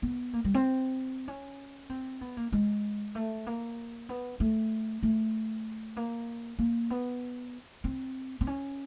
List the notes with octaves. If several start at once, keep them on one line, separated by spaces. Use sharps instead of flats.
B3
A#3
G3
C4
C#4
C4
B3
A#3
G#3
A3
A#3
B3
A3
A3
A#3
A#3
B3
C4
C4
C#4